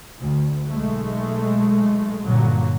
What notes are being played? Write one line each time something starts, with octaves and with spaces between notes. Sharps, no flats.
D2
B1 G#3 A3
G2 A#2 D3 F#3